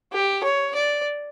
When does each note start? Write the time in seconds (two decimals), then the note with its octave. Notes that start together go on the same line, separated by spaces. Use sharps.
0.13 G4
0.44 C#5
0.75 D5